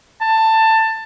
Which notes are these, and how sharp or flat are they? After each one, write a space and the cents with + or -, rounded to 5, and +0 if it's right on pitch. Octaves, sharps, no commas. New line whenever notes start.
A5 +15